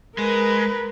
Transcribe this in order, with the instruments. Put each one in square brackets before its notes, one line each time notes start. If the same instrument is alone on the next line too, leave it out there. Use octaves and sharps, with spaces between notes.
[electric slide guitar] G#3 [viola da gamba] A#4 [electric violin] B4